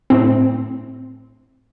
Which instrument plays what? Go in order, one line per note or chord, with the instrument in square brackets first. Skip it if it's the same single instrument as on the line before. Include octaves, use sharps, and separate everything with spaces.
[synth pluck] A2 C4